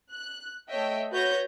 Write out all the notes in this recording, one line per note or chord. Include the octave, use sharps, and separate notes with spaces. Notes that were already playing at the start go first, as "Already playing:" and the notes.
F#6
A3 C#5 D#5 E5 G5
F#4 B4 C#5 G6 A#6